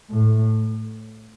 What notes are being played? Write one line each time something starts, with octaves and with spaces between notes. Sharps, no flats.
A2